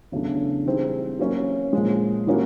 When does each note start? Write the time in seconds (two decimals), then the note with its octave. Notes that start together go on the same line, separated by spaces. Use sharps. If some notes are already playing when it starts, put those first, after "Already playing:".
0.12 E2 C#3 F#3 A3 D4
0.66 E3 G3 C4 D#4 G#4
1.19 F#3 A#3 C#4
1.73 A#2 F3 G#3
2.27 E3 G3 A#3 C#4 F#4